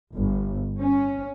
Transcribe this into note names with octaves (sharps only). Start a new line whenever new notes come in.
G1
C#4